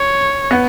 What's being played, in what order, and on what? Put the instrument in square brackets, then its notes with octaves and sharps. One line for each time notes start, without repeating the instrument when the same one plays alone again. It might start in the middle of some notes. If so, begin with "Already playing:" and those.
Already playing: [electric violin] C#5
[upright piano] B3